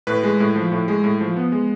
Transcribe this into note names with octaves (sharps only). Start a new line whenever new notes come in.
A2 B4
G#3
A2
F3
A2
G#3
A2
F3
B3
G#3